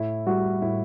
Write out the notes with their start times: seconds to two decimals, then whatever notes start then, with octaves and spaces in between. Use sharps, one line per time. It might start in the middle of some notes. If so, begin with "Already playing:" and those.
Already playing: A2 E4
0.27 G3 F#4
0.62 A2 E4